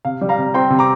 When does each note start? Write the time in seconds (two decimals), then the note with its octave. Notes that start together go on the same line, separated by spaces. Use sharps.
0.05 C3 F5
0.21 G3
0.29 F5 A#5
0.38 C3
0.54 C4 G5 C6
0.70 C3
0.79 A#5 D6